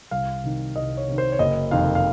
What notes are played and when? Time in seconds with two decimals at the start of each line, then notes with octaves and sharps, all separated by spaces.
0.11 C2 F5
0.44 C3 D#3
0.76 C2 D#5
0.97 C#5
1.08 C3 D#3
1.18 C5
1.32 C#5
1.39 F#1 D#5
1.71 F2 C3 D#3 F5
1.95 F5